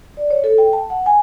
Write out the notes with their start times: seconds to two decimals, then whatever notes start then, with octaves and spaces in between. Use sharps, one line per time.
0.17 D5
0.30 C#5
0.44 A4
0.58 G5
0.73 A5
0.90 F#5
1.06 G#5